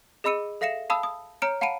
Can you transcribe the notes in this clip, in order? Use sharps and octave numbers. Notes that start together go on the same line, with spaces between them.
G#4 D#5 B5 E6 C#7 D#7
A4 E5 F5 A#6 C#7 E7
F5 A5 B5 D#6 E6
D#6
C#5 A#5 F6 C#7 D7
F5 F#5 A5 B5 D7 D#7